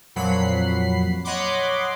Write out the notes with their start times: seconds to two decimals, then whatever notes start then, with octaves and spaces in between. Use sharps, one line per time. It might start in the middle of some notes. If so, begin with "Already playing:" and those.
0.16 F2 A#2 F#3 F#5 B5 C7
1.24 C#5 D#5 F#5 B5 C6 D6